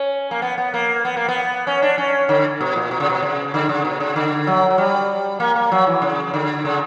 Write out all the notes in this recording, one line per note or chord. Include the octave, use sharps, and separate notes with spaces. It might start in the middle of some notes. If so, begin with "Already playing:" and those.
Already playing: C#4
A#3
B3
B3
A#3
B3
A#3
B3
C#4
D4
C#4
D3
B2
A#2
B2
C#3
B2
C#3
D3
C#3
B2
C#3
D3
F#3
F#3
G3
A#3
A#3
F#3
E3
C#3
D3
C#3